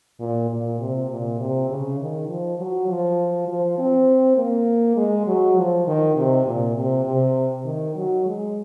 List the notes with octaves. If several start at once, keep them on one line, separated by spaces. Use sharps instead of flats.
A#2
A#2
C3
A#2
C3
C#3
D#3
F3
F#3
F3
F3
C4
A#3
G#3
F#3
F3
D#3
C3
A#2
C3
C3
D#3
F#3
G#3